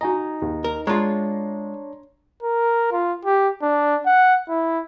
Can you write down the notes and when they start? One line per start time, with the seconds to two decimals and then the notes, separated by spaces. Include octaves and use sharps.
0.01 D#4 F#4 D#5 G#5 A#5
0.42 D#2
0.64 A#4
0.87 G#3 D4 F4 C#5 A#5 C6
2.43 A#4
2.92 F4
3.25 G4
3.62 D4
4.06 F#5
4.49 E4